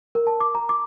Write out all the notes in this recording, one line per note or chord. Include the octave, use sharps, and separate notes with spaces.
A#4
A5
D6
A#5
D6